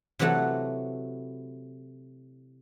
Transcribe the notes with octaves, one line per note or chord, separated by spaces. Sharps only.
C3 E3 F#3 A3 F#4 A4